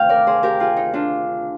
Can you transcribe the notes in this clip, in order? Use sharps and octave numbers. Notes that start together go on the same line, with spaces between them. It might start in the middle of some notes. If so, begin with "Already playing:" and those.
Already playing: D2 C3 D#3 C5 F5 G5
A#4 D5
G#4 C5
G4 A#4
F4 G#4
D#4
D4 F4